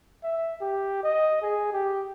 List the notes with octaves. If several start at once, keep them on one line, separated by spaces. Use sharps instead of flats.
E5
G4
D#5
G#4
G4